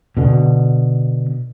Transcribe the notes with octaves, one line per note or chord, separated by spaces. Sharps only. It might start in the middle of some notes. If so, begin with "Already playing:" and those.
B2 D3